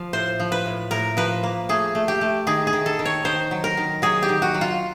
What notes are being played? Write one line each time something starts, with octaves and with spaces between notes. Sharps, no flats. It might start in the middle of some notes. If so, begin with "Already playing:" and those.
Already playing: F3 F5
A2 C5
F3
B4
A2
A2 A#4
F3 B4
A#3
A3 G#4
A3
G4
A3
D#3 G#4
G#4
D#3
A4
D#3
C#5
D#3 C5
F#3
A#4
D#3
F#3 G#4
G4
D#3
F#4
F#3
F4